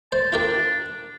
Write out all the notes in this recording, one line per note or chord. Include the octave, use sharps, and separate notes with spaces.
C5 A5
D4 F4 G4 A#4